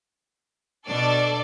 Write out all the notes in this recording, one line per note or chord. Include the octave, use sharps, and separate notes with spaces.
B2 D4 A4 D5